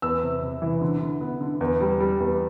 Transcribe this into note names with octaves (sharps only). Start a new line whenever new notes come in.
E2 E6
C3
C3
E3
D3
D3
B3
D3
E2
G3
G3
E2